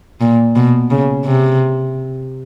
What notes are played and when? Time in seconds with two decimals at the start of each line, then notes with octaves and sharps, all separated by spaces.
0.21 A#2
0.56 B2
0.91 C#3
1.25 C3